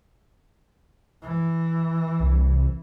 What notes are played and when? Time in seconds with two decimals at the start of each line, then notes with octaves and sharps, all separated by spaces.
1.22 E3
2.20 C2